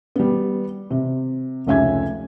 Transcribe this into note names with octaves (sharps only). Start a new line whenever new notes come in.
G3 B3
C3
F1 C#2 C#4 E5 G#5 G#6